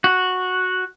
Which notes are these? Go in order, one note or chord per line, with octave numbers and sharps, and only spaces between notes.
F#4